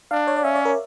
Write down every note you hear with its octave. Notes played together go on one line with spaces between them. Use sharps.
D4 F5
C#5
D5
C#4 E5
D5
A#4